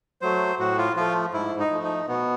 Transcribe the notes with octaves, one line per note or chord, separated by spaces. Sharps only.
F#3 A3 C5
A2 F#4
F4
F3 A3 F4
G#2 E4
D#4
F3 A3
D#4
B2 B3